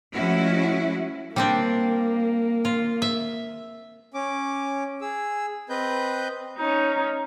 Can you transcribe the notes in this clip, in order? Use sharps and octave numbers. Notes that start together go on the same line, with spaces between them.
F3 G#3 A3 C#4 E4 F#4
G3 A#3 C4 D4
F4
E5
C#4 D6
G#4 E6
C4 B4 D#5 G6
C#4 D#4